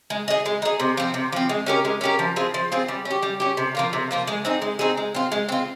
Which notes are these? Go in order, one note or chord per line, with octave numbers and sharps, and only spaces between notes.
G#3
D#4 G#4
G#3
D#4 G#4
C3
F3 C4
C3
F3 C4
G#3
C#4 G4 A#4
G#3
C#4 G4 A#4
F3
C4 F4 G#4
F3
C4 F4 G#4
G3
C#4
G4
G3
C#4 G4
C3
F3 A#3 F4
C3
F3 A#3 F4
G#3
C4 D#4 G#4
G#3
C4 D#4 G#4
G#3
C4 F4
G#3
C4 F4